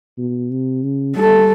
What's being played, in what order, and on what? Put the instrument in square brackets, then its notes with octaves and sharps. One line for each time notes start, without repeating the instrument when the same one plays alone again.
[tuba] B2
C3
C#3
[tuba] G3 [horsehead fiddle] A4